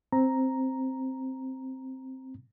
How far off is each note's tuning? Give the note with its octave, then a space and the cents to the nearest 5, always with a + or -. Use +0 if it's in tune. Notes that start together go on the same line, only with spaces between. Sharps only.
C4 +0 A#5 +0